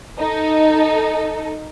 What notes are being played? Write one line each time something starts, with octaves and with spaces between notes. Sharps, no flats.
D#4 A4